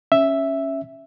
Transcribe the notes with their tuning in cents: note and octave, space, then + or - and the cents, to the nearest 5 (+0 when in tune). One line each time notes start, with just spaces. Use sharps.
C#4 -5 E5 +0